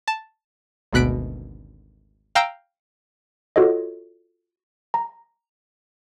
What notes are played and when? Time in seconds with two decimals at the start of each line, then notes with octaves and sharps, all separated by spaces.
0.07 A5
0.93 G#1 D2 B2 F#6 B6 D7
2.35 F5 G5 A#5 E6 D7
3.56 F4 F#4 A4 C#5 D#5
4.94 A#5